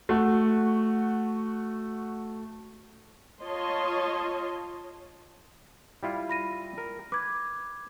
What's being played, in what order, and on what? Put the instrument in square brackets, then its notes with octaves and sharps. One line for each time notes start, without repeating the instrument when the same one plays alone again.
[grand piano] A3 F#4
[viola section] F4 C#5 D#5 A5 C6
[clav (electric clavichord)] G3 E4 F4
[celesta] B5 A#6 D#7
[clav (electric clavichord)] A#4
[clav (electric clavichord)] B4 [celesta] D6 G#6